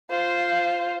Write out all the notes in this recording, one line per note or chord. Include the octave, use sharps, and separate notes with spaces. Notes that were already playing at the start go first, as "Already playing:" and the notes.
F4 C5